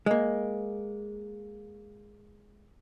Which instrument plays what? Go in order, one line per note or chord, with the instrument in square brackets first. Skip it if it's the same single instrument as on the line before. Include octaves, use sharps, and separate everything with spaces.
[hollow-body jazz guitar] G#3 A#3